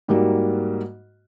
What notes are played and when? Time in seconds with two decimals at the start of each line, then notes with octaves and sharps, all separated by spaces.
0.08 G#2 G3 A#3 F#4